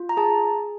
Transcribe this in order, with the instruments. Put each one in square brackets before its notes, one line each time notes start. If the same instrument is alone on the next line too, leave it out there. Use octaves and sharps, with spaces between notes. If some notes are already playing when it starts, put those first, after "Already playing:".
Already playing: [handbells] F4
A#5
G#4 A5